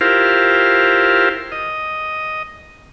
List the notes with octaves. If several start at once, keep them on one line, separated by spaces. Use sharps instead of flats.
E4 F4 G4 A#4 C5 F5
D#5